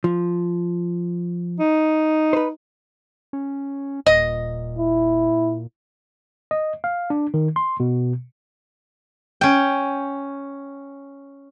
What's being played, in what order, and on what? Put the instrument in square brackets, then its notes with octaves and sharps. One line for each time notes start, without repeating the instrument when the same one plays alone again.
[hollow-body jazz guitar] F3
[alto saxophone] D#4
[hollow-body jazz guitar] B4 C5
[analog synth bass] C#4
[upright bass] D#1 [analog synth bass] A#2 [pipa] D#5
[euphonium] E4
[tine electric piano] D#5
F5
D4
D#3
C6
B2
[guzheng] C#4 G5